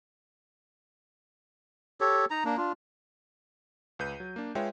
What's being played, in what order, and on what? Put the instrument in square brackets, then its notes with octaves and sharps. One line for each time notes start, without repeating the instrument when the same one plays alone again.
[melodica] G4 A4 C#5
D#4 A#5
A#3 D4
D4 F4
[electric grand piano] C#2 B4 G6 D#7
F#3
A#3 D4
G#3 F4 B4 C#5 E5 G5